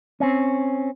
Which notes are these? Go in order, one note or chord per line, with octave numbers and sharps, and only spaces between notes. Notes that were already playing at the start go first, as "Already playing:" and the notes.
C4 C#4